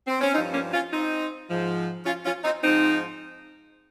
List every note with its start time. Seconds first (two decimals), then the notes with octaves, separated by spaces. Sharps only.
0.07 C4
0.21 C#4
0.34 G2 F3 C4 D#4
0.53 A#3 C#4
0.74 C#4 F4
0.92 C4 D#4
1.50 G#2 F3
2.06 C#4 F4
2.26 C#4 F4
2.44 C4 D#4
2.63 G#2 F3 C4 D#4